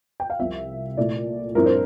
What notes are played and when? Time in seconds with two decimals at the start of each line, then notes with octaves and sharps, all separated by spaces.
0.20 G5
0.30 F5
0.39 C2 C3 F3 C4 E5
0.97 A#2 A3 E4 D5
1.55 G2 F3 C4 E4 A#4
1.66 C5